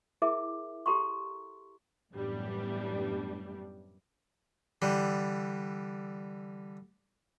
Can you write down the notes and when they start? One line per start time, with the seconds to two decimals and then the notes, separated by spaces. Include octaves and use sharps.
0.22 E4 G#4 A#4 E5 D6
0.86 G4 A4 A#5 C6 C#6
2.12 F#2 A2 E3 G3 B3 D4
4.82 D3 E3 G3